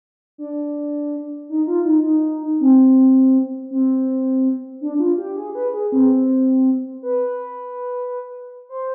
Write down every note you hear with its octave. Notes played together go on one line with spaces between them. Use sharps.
D4
D#4
F4
D#4
D#4
C4
C4
D4
F4
G4
G#4
B4
G#4
C4
B4
C5